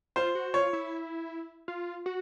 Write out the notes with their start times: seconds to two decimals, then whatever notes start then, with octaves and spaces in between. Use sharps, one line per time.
0.16 F4 C5
0.35 F#4
0.54 F4 C#5
0.73 E4
1.68 F4
2.06 F#4